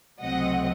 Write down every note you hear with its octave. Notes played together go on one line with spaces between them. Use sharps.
C#2 C3 F#3 A3 C4 D#5 F#5